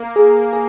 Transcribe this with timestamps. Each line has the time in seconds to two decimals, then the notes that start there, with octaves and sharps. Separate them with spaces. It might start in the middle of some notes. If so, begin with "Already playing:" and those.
Already playing: A#3
0.16 G#4
0.53 G#4